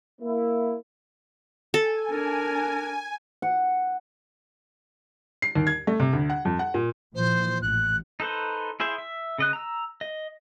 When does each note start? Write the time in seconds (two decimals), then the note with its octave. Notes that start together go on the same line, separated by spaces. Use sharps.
0.21 A#3 E4
1.74 A4 G#5
2.10 D4 A#4
3.42 F#5
5.42 C7
5.55 D#2
5.67 G#6
5.87 A3
6.00 C3
6.13 D2
6.30 F#5
6.45 F2
6.59 F#5
6.74 A#2
7.15 A#2 E3 F3 C5
7.62 A1 F#6
8.20 D#4 A4 B4 C5
8.80 E4 G#4 C5 E5
8.98 E5
9.38 C#3 D#5 F#6
9.53 A#5 E6
10.01 D#5